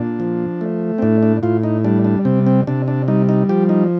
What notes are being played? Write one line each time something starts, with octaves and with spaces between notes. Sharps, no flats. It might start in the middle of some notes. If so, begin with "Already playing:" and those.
Already playing: A#2 D4
F3
A3
C4
A2 D4
D4
A2 F4
D#4
G3 D4
D4
C3 C4
C4
C3 D4
D4
G3 D#4
D#4
F3 G4
D#4